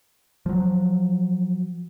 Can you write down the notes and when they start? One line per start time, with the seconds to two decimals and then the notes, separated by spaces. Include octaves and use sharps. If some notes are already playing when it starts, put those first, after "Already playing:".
0.46 F3 F#3